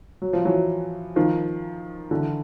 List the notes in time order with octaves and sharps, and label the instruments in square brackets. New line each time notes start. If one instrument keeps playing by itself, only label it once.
[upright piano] F#3
F3
E3 F#3
D#3 F3
D3 E3